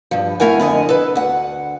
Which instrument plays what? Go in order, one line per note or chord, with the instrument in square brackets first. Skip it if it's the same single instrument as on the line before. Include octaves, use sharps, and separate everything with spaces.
[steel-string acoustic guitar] G2 F3
A3 E4 A#4 F#5 G#5
F2 D3 D#5 G#5
A4 B4
D2 F#5